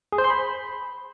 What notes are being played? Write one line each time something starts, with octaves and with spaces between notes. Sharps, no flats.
G#4
C5
C6
B5